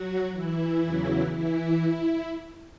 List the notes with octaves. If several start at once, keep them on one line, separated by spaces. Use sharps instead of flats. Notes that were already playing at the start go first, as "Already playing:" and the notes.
Already playing: F#3 F#4
E3 E4
E2 C#3 F#3
E3 E4